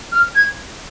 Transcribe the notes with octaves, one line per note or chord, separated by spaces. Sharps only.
F6
G#6